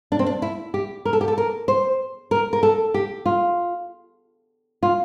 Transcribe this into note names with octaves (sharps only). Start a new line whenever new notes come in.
D4
C4
D4
E4
G4
A#4
A4
G4
A4
A#4
C5
A#4
A#4
A4
G4
F4
F4